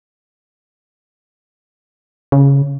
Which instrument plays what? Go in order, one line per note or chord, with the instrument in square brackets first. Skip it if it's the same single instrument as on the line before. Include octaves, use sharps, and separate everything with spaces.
[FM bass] C#3